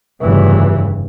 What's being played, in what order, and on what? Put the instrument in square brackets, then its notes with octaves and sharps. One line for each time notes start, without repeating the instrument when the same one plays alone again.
[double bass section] F1 G2 C#3 E3